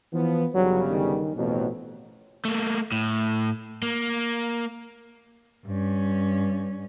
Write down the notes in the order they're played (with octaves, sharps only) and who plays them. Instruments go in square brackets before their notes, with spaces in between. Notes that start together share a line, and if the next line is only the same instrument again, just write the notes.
[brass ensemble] E3 F3 B3
[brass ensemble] G1 C#3 G3 [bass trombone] F#3
[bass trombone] D#3
[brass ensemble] A1 F2 F#3 [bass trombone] B2
[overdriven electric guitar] A3 A#3
A2
A#3
[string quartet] G2 C#4